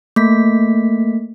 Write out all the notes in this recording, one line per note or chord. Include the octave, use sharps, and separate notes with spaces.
A3 A#3 B6